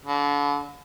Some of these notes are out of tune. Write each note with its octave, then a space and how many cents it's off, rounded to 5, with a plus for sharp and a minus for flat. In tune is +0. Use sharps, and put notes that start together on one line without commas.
D3 -35